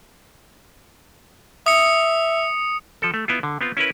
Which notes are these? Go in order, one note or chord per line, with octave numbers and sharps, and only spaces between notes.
E5 D#6 C#7
F3 A4
A3
B3 E4 F4
D3
B3 C4 F4
C#4 E4 A#4 B4